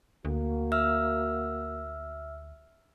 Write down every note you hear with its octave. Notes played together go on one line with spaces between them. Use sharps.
D2 A#3 F#4
E5 E6 F6